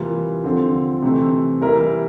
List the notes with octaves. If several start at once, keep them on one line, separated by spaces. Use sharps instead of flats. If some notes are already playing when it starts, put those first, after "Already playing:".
Already playing: C3 E3 G3 A#3 F4
D3 F3 C4 G4
C3 E3 A3 C4
E3 G3 A#3 E4 A#4